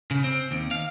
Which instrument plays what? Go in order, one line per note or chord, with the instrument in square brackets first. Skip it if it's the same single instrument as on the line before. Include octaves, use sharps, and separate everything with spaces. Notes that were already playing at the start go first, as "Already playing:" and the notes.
[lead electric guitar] C#3
C4
D#2
F5